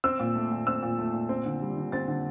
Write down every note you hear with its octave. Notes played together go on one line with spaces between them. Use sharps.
C4 E6
A#2
A3
A#2
C4 E6
A#2
A3
A#2
C4
D3
G3
D3
C4 A6
D3